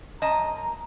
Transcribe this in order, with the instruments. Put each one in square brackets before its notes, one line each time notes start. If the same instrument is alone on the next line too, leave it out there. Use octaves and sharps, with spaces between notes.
[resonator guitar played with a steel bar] F#2 D#5 A5 [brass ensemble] A#5